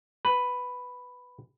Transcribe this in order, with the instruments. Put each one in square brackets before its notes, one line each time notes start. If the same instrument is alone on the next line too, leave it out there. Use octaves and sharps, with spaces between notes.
[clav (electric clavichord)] B4